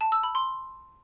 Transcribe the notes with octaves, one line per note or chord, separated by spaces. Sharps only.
A5
E6
B5
C6